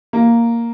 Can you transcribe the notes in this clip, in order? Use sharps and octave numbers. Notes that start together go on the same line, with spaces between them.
A#3